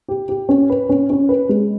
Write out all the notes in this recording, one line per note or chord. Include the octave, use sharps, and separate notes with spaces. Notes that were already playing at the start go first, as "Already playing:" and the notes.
G4
G4
C#4
B4
C#4
C#4
B4
G#3